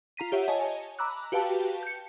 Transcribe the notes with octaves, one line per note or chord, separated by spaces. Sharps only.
F4 A#5 B6 D#7
G4 C#5 E5 F#5
C#5 D#5 G#5 A5
A#5 B5 D6 E6 F#6
F#4 G4 B4 F5 G5 A5
G6 C#7